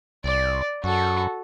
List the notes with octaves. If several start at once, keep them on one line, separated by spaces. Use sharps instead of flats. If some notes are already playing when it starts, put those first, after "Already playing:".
C2 D5
F#2 F#4 A4